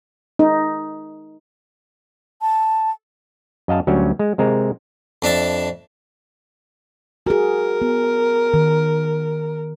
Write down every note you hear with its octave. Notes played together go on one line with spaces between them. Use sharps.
D#4
A5
F#2 D#5 F5 A5
D2 F#3 G3 C#4
G#3
C3 G#3 C4 A#4
F2 D4 E5 A5
F#4 G#4 A#4
B3
D#3